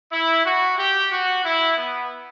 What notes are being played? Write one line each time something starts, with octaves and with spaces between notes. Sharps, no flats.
E4
F#4
G4
F#4
E4
B3